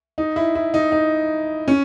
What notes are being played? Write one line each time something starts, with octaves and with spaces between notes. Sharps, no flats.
D#4
E4
E4
D#4
D#4
C#4